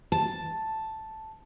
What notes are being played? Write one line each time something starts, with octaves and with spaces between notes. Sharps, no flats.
A5